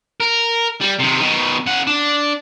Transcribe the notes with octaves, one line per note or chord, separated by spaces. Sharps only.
A#4
G3
C3 D#3
B2 D#3
C#3 F#5
D4